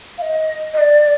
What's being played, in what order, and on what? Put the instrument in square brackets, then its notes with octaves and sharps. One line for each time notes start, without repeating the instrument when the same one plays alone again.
[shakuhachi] F5
D#5
D#5
D5